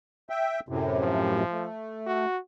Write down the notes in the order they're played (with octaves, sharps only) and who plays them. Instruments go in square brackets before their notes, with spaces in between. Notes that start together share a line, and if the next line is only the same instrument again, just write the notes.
[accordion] E5 G5
F#2 A2 C3
[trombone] F3
[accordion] A3
[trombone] F#4